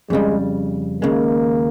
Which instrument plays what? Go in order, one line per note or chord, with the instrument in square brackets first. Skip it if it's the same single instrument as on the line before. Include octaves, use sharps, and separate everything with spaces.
[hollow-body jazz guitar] F2 C#3 G3 [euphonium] G#3
[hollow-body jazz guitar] D#2 C#3 G#3 [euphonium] A#3